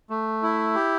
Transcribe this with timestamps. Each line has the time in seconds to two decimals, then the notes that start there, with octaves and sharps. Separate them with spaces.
0.10 A3
0.42 E4
0.75 G4